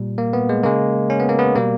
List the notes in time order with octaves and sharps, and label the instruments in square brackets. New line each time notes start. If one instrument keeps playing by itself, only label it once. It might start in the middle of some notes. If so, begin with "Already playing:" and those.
Already playing: [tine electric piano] A#2 G3
A#3
B3
G#3
C#3 G#3 A#3
C#4
B3
A#3
B3
B2 G3 A#3